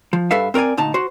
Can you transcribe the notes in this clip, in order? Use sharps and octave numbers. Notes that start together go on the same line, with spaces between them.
F3
G2 G3 A4 B4 E5 F5
C4 A#4 C#5 D5 G#5
D2 A#2 D#4 A5
F#4 C5